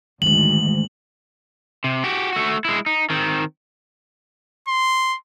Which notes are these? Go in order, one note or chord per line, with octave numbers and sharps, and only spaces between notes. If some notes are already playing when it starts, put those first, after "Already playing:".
D2 G#2 D#3 E3 F#7
C3
F#4 G4
A3 F#4
G#3 E4
D#4
D#3 C4
C6